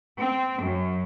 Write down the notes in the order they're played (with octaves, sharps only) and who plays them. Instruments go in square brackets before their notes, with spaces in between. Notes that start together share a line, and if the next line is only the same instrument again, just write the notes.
[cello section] C4
F#2